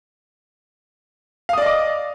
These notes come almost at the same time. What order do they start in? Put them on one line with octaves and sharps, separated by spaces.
F5 D#6 D5 D#5 D6